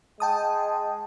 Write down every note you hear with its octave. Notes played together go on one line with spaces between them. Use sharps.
G#3 G5 A5 D#6